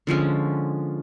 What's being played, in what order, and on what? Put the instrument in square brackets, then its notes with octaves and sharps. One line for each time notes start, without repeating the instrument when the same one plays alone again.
[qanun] D3 F3 G#3 C#4